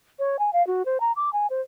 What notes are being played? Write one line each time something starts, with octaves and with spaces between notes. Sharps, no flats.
C#5
G#5
F5
F#4
C5
A#5
D6
G#5
C5